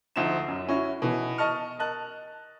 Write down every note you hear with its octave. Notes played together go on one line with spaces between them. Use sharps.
D2 F3 D#4 E7
F#2
C#4 E4 F#4
B2 E3
D#5 A5 C#6 F6
A#4 D#5 A5 F#6